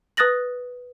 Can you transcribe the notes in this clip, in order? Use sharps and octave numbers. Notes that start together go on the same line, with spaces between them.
B4 D#6 F#6 A6 A#6 F#7